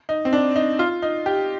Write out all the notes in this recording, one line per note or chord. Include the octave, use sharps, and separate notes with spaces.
D#4
C4
D4
D#4
F4
D#4
G4